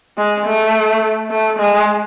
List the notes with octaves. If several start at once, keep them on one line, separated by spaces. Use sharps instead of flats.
G#3
A3
A3
G#3